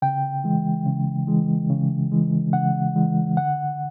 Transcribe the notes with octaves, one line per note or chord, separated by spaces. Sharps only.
C#3 G5
E3 G#3
C#3
E3 G#3
C#3
E3 G#3
C#3 F#5
E3 G#3
D3 F#5